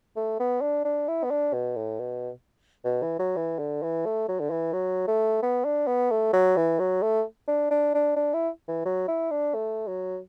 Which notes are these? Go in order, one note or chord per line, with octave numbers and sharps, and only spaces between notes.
A3
B3
D4
D4
E4
B3
D4
B2
A2
B2
B2
E3
F#3
E3
D3
E3
A3
F#3
D3
E3
F#3
A3
B3
D4
B3
A3
F#3
E3
F#3
A3
D4
D4
D4
D4
E4
E3
F#3
E4
D4
A3
F#3